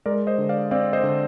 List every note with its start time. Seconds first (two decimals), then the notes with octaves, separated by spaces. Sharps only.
0.06 G#3 A#4 D5
0.27 C5 D#5
0.38 D3
0.49 D5 F5
0.71 C4 D5 F5
0.93 C5 D#5
1.03 D3